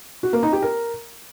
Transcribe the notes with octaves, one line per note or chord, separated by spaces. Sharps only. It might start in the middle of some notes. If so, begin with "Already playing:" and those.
F#4
A#3
D#4
G4
A#4